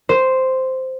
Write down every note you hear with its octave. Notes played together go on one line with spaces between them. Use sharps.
C5